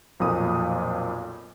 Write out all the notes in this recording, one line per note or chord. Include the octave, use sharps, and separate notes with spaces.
B1 F2 A#2 D#6